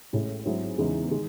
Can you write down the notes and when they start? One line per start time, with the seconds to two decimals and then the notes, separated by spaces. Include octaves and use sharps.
0.13 A1 A2 G#3 C#4 E4
0.45 G#2 F#3 C4 E4 G#4
0.78 E2 C#3 E3 G#3 D#4
1.11 D#3 G#3